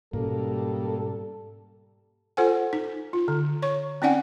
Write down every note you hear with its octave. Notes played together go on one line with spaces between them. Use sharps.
G#2 B2 G3 A#3 C#4 A4
F4 A4 C5 F#5 G#5
D#4
F4
D3
C#5 C#6
C4 C#4 D#4 D5 F#5 G#5